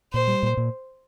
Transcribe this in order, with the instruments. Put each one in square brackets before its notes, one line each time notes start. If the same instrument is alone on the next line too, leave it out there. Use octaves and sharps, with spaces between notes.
[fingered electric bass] A#2 [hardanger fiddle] C5
[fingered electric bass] G3
A#2
A#2